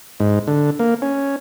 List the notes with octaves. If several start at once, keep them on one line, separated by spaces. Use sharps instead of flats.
G#2
D3
A#3
C#4